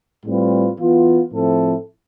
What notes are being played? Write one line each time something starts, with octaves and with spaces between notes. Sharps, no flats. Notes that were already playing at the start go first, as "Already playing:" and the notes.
A2 G3 C4 F4 B4
E3 B3 F4
A2 F3 C4 E4 A4